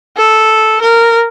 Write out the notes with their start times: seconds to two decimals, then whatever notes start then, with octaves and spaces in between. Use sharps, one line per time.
0.17 A4
0.81 A#4